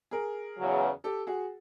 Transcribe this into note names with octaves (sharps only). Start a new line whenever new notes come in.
G#4 A#4
E2 C#3 F#3
G4 A4
F#4 G#4